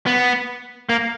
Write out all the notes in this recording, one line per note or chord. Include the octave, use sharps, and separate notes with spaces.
B3
A#3